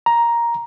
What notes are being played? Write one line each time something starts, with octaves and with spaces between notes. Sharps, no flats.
A#5